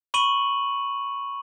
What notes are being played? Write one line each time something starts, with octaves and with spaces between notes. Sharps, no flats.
B5 C#6 D#7 F#7